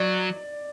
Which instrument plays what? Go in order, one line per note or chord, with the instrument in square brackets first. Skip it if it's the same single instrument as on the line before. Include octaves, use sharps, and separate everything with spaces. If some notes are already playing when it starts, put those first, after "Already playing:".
Already playing: [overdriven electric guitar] F#3 [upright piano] D5